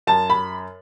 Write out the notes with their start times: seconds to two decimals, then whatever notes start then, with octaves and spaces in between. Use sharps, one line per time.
0.07 F#2 A5
0.30 B5